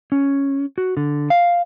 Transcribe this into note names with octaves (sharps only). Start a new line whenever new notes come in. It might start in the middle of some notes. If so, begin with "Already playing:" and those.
C#4
F#4
D3
F5